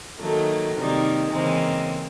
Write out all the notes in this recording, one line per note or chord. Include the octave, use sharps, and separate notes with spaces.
D#3 F#3 A3 A#3
C3 D#3 G3 A#3
C#3 E3 G#3 A#3 C4